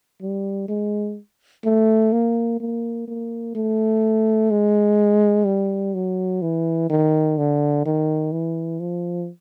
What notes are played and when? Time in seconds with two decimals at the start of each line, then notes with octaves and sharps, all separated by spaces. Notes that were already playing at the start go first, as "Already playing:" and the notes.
0.22 G3
0.69 G#3
1.65 A3
2.13 A#3
2.60 A#3
3.08 A#3
3.55 A3
4.51 G#3
5.46 G3
5.94 F#3
6.42 E3
6.90 D#3
7.38 D3
7.86 D#3
8.32 E3
8.80 F3